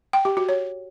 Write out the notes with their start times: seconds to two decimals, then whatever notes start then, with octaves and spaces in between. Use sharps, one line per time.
0.13 G5
0.25 G4
0.37 F#4
0.49 C#5